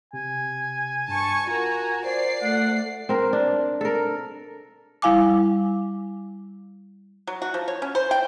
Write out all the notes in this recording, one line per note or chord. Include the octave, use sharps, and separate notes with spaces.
C3 G#5
G2 A5 C#6
F4 F#4 A#4 A#5
C5 D5 C7
A3 F#5
C4 A#4
D4
A4 A#4
G3 E4 F5 G#5 D6
F#3
F#4
F3
C#5
C#4
C5
G5